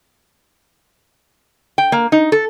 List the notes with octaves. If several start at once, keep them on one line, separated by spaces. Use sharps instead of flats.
G5
A#3
D#4
A4